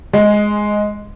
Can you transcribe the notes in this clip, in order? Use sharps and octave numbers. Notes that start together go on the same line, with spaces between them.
G#3